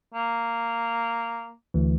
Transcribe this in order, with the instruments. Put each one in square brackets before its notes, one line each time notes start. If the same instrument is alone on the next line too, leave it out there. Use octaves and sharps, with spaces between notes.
[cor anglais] A#3
[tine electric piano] D2 E3